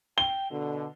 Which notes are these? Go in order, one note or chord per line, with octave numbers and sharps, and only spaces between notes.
G5 G7
B2 D3